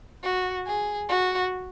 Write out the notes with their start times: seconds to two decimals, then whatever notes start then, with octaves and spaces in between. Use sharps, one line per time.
0.24 F#4
0.67 G#4
1.09 F#4